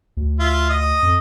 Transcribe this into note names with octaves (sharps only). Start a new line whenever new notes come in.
D2
F4 E5
D#5 D#6
F2